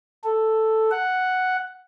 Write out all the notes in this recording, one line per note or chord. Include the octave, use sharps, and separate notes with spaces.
A4
F#5